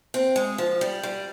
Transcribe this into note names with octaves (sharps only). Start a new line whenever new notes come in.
C4
G#3
F3
G3
G3